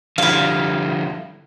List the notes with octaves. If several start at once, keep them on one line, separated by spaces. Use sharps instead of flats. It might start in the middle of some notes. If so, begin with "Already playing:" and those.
D3 F3 G3 E4 F5